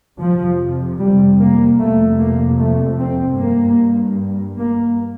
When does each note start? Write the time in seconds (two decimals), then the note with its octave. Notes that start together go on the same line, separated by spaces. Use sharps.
0.20 F2 C3 F3
1.00 G3
1.40 A#3
1.79 F2 C3 A3
2.19 A#3
2.59 A3
2.99 C4
3.38 G2 A#3
4.57 A#3